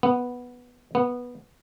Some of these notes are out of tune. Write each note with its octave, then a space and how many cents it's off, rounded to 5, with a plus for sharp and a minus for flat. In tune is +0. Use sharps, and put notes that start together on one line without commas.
B3 -5
B3 -10